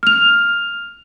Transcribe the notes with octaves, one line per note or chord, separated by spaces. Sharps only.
F6 F7